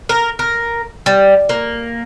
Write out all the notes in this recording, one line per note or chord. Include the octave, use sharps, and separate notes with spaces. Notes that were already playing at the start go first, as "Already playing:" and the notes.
A#4
A#4
G3
A#3